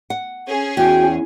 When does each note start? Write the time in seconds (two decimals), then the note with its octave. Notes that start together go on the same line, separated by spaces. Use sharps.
0.10 F#5
0.48 C#4 G#4
0.77 E2 F#4 G5